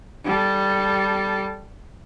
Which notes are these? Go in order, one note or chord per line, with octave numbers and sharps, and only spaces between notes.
G3 A4